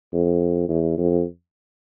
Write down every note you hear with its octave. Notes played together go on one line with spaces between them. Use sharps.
F2
E2
F2